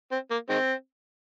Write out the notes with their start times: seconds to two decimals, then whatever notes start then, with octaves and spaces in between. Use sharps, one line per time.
0.11 C4
0.30 A#3
0.49 D#3 G#3 C4